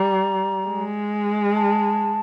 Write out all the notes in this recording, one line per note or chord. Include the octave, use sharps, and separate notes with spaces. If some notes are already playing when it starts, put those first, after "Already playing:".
Already playing: G3 A#5
G#3
A5